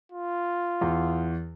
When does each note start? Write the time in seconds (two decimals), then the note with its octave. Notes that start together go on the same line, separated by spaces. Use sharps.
0.12 F4
0.81 E2